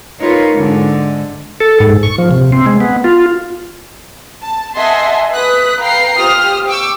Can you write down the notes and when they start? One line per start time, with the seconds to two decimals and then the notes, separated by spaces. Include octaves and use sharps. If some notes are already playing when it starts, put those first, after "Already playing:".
0.20 D#4 F4 A#4 B4 C#5
0.54 G#2 D3 G#3
1.60 A4
1.80 G#2
2.03 C#6
2.18 F3
2.31 C3
2.52 C4
2.66 G#3
2.80 B3
3.04 F4
4.43 A5
4.75 D#5 E5 F#5 G#5 A5 C6
5.33 B4 D#6 F#6 B6
5.81 B4 F5 G5 A#5 C7
6.17 F4 G4 C5 D#6 F6
6.67 G5 C#6 D6 E6